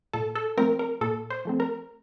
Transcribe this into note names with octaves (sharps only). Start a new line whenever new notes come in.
A#2 A4
A4
F3 A3 C4 A#4
A#4
A#2 A4
C5
F3 A3 C4
A#4